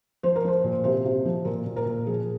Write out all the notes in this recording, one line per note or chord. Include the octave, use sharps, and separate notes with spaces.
F3 C5
A#4
F3 C5
A#2
C3 C5
C3
F3
A#2 A#4
A#2
A#4
A#2
F3 G#4